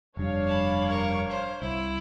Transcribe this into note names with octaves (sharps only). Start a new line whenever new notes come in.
F1 G2 D4 C#5 F5
A5 B5
A#4 C#6
C5
C2 E4